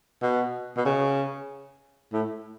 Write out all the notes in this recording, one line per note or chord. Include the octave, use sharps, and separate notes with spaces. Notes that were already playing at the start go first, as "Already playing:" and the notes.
B2
B2
C#3
A2